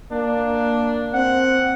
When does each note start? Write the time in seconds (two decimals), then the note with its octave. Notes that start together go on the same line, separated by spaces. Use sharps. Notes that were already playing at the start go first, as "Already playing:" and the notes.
0.12 A#3 D4
1.14 C4 F#5